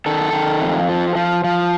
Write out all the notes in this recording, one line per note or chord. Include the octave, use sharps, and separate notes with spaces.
D#3 A4
D#3
F2
F3
F3
F3